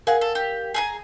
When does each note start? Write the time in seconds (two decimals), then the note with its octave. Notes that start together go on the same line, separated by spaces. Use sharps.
0.07 G#4 A#4 F5 F#5
0.21 A4
0.35 G4
0.74 G#4 G#5 A#5